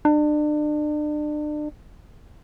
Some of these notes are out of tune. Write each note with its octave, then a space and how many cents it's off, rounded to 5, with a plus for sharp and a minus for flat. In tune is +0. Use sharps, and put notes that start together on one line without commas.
D4 +35